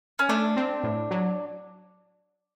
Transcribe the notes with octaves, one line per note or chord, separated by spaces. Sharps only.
C#4
A3 D4
C4
A2
F#3